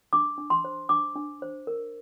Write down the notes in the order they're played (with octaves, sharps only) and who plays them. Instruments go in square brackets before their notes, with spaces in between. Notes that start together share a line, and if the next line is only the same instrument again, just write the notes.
[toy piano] D4 D6
D4
C6
C5
D4 D6
D4
C5
A#4